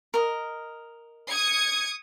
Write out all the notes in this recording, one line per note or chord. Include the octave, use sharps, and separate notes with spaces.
A#4 D#5
D#6 G#6 C#7